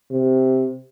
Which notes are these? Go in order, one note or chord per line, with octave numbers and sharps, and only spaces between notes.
C3